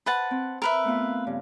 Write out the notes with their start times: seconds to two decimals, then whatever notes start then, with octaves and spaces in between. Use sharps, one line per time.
0.06 B4 C5 F#5 A5
0.31 C4
0.62 A#4 B4 E5
0.85 A3 B3 F4
1.27 G2 C#3